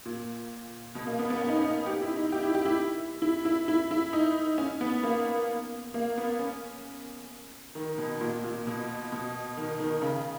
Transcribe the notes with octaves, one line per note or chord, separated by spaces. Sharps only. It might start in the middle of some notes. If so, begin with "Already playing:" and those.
A#2
B2
A#3
B3
B3
C#4
D#4
C#4
D#4
G4
E4
D#4
G4
E4
G4
E4
E4
E4
E4
E4
D#4
C#4
B3
A#3
A#3
B3
C#4
D#3
B2
A#2
A#2
B2
B2
D#3
D#3
C#3